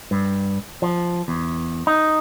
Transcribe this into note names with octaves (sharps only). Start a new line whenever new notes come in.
G2
F3
E2
D#4